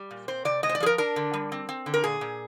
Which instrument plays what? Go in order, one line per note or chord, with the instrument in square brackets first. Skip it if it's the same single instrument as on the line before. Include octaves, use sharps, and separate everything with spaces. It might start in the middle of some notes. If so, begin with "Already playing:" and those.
Already playing: [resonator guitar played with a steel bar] G3
A#2
C4 C5
C3 D5
G#3 D#5
C5
D5
F3 G#4
A#4
D4 A#4
D3
G3
C4
C4
D3
A#4
A#2 G#4
A#2